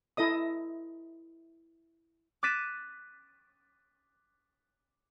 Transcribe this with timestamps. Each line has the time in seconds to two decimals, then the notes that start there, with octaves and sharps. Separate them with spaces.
0.17 E4 A4 D#5 D#6
2.43 D6 F#6 A6 B6 D#7 E7